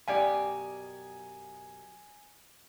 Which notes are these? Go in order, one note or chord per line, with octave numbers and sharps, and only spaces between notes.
F#2 B2 G4 D5 F5 G#5